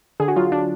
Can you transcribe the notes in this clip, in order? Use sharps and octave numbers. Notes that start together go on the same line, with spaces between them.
D3 G#4
F#4
F#3 F4
D4